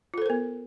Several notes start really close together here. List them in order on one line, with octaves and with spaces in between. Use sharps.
F4 A4 C5 A#4 B3